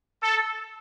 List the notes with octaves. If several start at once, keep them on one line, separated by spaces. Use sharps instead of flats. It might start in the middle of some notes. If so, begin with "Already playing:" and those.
A4